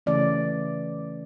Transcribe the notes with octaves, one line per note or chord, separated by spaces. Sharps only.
C#3 E3 A3 C#4 D5